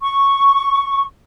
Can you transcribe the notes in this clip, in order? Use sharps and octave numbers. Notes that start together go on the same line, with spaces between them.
C#6